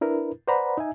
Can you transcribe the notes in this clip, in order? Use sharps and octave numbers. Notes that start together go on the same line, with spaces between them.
D4 E4 A#4 B4
B4 C5 D5 F#5 A#5 B5
D#4 E5 G#5